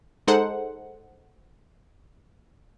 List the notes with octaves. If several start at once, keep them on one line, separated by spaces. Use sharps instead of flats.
G#3 D#4 A4 C5 F#5